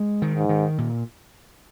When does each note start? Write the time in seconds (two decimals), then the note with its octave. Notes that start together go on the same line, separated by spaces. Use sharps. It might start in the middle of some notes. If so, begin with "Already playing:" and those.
Already playing: G#3
0.22 D#3
0.36 G#2
0.49 D#3
0.78 A#2